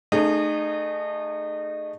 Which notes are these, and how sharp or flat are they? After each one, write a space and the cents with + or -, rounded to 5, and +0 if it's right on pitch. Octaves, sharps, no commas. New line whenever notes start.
A3 +0 D#4 -30 G#4 -15